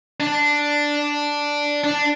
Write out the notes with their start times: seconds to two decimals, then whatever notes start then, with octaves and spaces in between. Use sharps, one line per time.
0.20 D4
1.84 D4